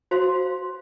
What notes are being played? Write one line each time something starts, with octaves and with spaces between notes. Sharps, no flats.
F#4 C5 F5 C6